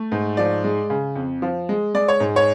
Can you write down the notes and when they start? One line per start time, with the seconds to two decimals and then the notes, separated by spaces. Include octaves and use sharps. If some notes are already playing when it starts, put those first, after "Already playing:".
Already playing: A3
0.12 G#2
0.37 F3 D5
0.64 G#3
0.90 C#3
1.16 F2
1.42 F3
1.69 G#3
1.95 G#3 D5
2.08 C#5
2.20 G#2
2.36 C#5